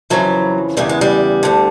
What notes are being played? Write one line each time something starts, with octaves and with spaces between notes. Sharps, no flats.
F2 C#3 E3 F#3
E2 C#3 E3 G3
G#3
G3
D2 D3